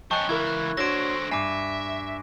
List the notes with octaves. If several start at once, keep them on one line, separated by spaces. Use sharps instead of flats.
F3 C#4 D#5 G5 A5 C#6 F#6
C#2 E3 E4 A#4 G#6
F#6
D3 D4 F#4 C5 C#5 A#6 D7
G2 E5 G#5 D6 C7